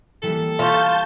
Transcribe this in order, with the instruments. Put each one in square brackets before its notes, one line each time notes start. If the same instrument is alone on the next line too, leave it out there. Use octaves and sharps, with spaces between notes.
[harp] E3 G3 A#3 [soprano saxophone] A4
[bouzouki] F4 [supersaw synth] A5 G6 [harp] A#5 C#6 B6